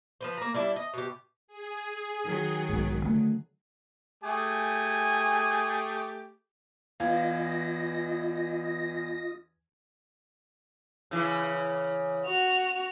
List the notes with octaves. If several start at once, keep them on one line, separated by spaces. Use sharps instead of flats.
F3 B4 C5
A#3 A#5
G3 D4 E4
D#5
B2 G4
G#4
D#3 F#3
B1 G#2
D3 A3
A3 G4 G#4 G#5
E2 E3 F4 D#5 F5 G#6 A#6
C#3 E3
F#4 F7